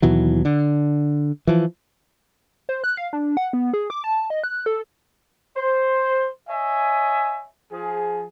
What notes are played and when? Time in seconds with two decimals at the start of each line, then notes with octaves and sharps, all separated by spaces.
0.02 D#2 B2 E3 F#3
0.45 D3
1.47 E3 F3
2.69 C5
2.84 F#6
2.97 F5
3.13 D4
3.37 F#5
3.53 B3
3.73 G#4
3.90 D6
4.04 A5
4.30 D#5
4.44 F#6
4.66 A4
5.57 C5
6.49 C#5 D#5 E5 G#5
7.72 F3 G#4